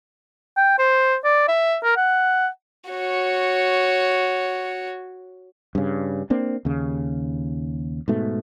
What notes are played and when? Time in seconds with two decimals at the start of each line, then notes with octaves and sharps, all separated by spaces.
0.57 G5
0.79 C5
1.24 D5
1.48 E5
1.83 A#4
1.97 F#5
2.90 F#4 C#5
5.75 G2 C#3
6.30 A#3 C4 D4
6.65 D#2 C#3
8.08 G#2 B2 A3